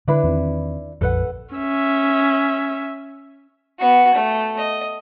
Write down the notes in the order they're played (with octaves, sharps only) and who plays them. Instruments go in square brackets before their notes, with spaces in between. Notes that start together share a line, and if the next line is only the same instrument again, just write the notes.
[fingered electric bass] D3 [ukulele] D4 E4 B4
[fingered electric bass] E2 D#3 C4
[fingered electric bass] A#1 F2 [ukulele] A4 B4 F#5
[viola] C#4 E5
[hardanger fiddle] B3 F#4
A3
D#5